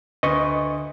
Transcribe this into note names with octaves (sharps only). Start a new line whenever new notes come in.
D2 B4 D#5 C#6 D#6